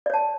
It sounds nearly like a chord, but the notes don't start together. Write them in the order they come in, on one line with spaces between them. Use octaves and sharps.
D5 C#5 A5